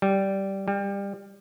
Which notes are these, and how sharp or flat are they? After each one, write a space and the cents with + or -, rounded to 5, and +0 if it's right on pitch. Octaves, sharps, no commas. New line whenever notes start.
G3 -10
G3 +25